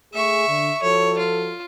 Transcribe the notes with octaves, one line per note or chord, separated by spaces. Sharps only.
A3 G#4 E5 C#6
D3
F3 F#4 A4 C#5
F4